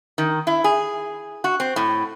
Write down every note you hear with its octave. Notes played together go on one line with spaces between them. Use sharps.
D#3
E4
G#4
F#4
C4
A2